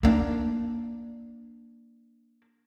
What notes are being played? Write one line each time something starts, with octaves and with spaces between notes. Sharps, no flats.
A#3 D4